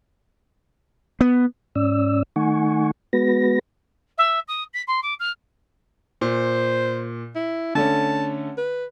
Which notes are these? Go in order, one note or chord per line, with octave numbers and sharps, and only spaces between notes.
B3
G#2 C#4 D5 E6
D#3 A3 D#4 F#5 G#5 C#6
G#3 B3 F#4 B4 A#6
E5
D#6
B6
C6
D6
F6
A#2 C5
E4
D3 A3 C#4 A5
B4